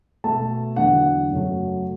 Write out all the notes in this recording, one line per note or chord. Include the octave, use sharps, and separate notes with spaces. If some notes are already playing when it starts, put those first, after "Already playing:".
B2 A3 A5
E2 D3 F#3 A3 F#5
F#2 C#3 F#3 A3